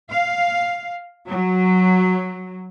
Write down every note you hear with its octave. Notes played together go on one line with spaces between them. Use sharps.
F5
F#3